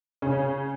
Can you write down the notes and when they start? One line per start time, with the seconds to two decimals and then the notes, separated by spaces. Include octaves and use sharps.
0.22 C#3 C#4